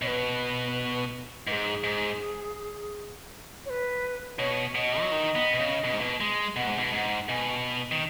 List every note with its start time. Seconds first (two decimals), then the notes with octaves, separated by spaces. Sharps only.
0.02 B2 C#5
0.07 B4
1.47 G#2 B4
1.52 G#4
1.84 G#2
3.66 C#5
3.70 B4
4.39 B2 C#5
4.75 B2 D#5
5.01 F#3
5.11 D#3
5.35 B3
5.53 B2
5.59 C#3
5.84 B2
5.93 G#2
6.01 B2
6.21 G#3
6.56 B2 F#5
6.67 G#2
6.78 B2
6.93 G#2 F#5
7.29 B2 G#5
7.92 D#3